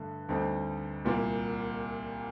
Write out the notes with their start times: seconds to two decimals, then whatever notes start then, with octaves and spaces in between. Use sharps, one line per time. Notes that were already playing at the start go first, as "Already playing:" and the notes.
Already playing: G2 D3 A3
0.29 D2 D3 G3 C4 D#4
1.05 C2 A#2 G3 A#3